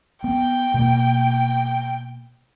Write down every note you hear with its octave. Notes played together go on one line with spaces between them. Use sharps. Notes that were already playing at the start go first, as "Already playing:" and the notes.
B3 G5
B2 A#3